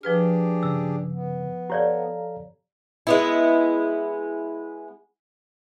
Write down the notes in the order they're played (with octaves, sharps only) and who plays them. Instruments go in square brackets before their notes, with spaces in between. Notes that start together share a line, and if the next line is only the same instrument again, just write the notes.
[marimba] F3 B4 F6 [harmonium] D4 G4 G#4
[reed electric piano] G2 C#3 [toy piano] E6
[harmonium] B3
[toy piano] G4 C#5 D5 [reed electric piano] A4 F5 A#5
[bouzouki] G#3 B3 E4